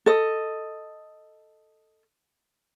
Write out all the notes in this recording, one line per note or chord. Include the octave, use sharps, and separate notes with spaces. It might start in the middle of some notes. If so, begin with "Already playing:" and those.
A4 D#5